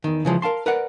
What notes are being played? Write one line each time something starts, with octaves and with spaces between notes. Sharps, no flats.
E2 D#3
C#3 E3 F3 G#3
A#4 F5 A5 C6
A#4 B4 D5 F#5